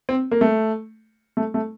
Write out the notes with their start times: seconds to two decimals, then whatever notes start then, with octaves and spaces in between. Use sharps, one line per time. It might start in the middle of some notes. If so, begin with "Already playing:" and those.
0.09 C4
0.31 A#3
0.41 A3
1.37 A3
1.54 A3